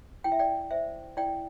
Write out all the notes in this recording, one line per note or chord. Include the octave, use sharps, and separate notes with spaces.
E4 G5
E5
D5 G5
C5 E5
E4 D5 G5